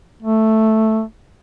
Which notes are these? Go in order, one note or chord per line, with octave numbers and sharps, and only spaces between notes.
A3